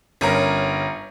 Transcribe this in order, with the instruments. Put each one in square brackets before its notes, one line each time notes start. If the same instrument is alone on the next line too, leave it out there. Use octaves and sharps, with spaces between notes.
[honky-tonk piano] G1 C#4 A#4